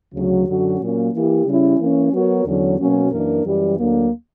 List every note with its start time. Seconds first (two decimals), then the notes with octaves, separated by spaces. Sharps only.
0.14 D2 C#3 F#3
0.47 F#2 D3 F#3 C#4 F#4
0.80 A#2 F#3 A#3 C#4
1.13 E3 A#3 E4 G4
1.46 C#3 G3 C#4 E4
1.79 E3 A#3 C#4
2.12 F#3 B3 F#4 A#4 C#5
2.45 E2 D3 F#3 C#4
2.79 B2 F#3 A#3 C#4
3.11 F#2 E3 A#3 D4 A#4
3.45 F#2 E3 G3
3.77 D2 D3 F#3 A#3